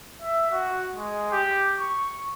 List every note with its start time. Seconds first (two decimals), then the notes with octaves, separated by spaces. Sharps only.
0.22 E5
0.51 F#4
0.94 G#3
1.32 G4
1.79 C#6